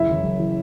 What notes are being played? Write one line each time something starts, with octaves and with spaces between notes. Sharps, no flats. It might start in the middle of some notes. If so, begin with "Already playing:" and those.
Already playing: F#1 E4 E5
F#2 E3
F#1
E3